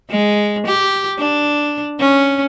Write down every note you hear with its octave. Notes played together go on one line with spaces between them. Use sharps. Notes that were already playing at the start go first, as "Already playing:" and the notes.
G#3
G4
D4
C#4